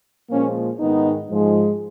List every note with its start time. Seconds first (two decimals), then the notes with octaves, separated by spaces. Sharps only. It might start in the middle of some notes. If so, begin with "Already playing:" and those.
0.29 A#2 F3 G#3 A#3 C#4
0.79 G#2 D#3 G#3 B3 D#4
1.29 G#2 F3 G#3